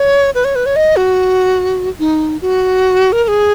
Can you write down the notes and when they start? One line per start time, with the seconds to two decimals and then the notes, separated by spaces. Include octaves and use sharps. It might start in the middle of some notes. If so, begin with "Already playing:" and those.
Already playing: C#5
0.35 B4
0.45 C#5
0.55 B4
0.66 C#5
0.76 D#5
0.96 F#4
2.00 D#4
2.42 F#4
3.12 A#4
3.23 A#4
3.28 G#4